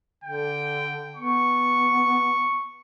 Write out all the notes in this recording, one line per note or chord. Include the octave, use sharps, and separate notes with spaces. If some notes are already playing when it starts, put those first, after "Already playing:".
D3 G5
B3 C#6